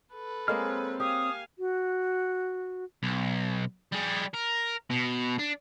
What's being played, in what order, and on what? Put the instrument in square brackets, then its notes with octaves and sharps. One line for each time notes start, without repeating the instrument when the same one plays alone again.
[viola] A4 B4
[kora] G#3 A#3 D#5 [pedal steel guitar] C4 C#5 F6
[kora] G4 [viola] F5 G#5 [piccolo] D#6
[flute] F#4
[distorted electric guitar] B1
G3 G#4
A#4
B2
D4